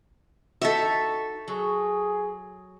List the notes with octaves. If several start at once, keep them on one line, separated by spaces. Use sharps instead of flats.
D#4 F#4 A4 E5
F#3 G#4